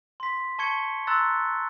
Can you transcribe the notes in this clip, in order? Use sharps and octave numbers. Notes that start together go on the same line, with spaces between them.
C6 B6
A5 C#6 G#6 C#7 G7
A#5 C6 E6 F#6 A6